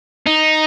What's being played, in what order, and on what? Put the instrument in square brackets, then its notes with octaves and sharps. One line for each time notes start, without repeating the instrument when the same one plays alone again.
[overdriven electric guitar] D#4